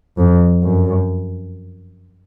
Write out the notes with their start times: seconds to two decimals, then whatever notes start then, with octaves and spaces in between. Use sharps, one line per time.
0.18 F2
0.64 F#2